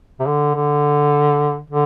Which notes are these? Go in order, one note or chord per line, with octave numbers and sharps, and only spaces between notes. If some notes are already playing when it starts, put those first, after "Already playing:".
C3
D3
D3
D3